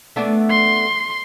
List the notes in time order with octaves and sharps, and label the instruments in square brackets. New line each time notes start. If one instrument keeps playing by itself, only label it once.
[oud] A3 B3 D4
[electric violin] C6